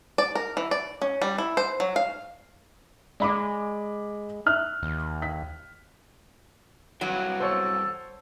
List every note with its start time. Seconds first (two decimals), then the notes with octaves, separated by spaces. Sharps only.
0.18 D5
0.35 A#4
0.57 E3
0.71 D5
1.02 C#4
1.22 G3
1.38 E4
1.57 C5
1.80 F#3
1.96 F5
3.20 G#3 D5 B5 D6
4.46 E5 F6 F#6
4.83 D#2
5.22 B6
7.01 G2 E3 F#3
7.40 A4 C5 C#5